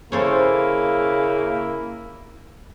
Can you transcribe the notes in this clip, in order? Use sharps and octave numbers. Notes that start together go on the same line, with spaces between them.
C#3 A#3 E4 A4 C5 C#5